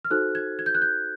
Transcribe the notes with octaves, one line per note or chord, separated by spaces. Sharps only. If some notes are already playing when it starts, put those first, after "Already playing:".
F6
D#4 F#4 A4 C5 F#6
G#6
G#6
G6
F#6
G6